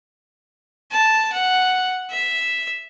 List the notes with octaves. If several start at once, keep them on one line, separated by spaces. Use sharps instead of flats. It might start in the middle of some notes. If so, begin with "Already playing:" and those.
A5
F#5
E5